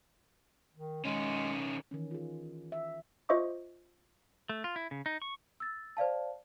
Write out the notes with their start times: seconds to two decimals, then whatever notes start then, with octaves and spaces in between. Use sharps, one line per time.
0.75 D#3
1.05 D#3 G#3 C#4
1.91 D#3 E3 C#4
2.11 F4 G#4
2.72 E5
3.29 F4 C5 D#5 E5 C#6 D6
4.49 A3
4.64 F4
4.76 E4
4.91 C#3
5.06 D#4
5.22 C#6
5.60 E6 A6
5.97 C5 D5 F5 A5